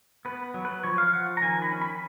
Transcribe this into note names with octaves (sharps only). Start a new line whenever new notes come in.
B3 B4
F#3
B4
F3 C#5
F5
F3 F#5
A#5
D#3 G#5
B5
C#4
B5